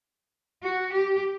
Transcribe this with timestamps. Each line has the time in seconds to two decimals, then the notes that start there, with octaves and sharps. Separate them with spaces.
0.63 F#4
0.93 G4